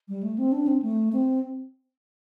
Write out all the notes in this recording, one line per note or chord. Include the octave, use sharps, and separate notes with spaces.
G3
A3
C4
D4
C4
A3
C4